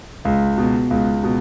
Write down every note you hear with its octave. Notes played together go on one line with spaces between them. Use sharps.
C#2
B2
C#2
B2